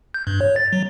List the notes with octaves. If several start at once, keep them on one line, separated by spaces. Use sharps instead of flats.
G6
G2
C#5
A6
F#3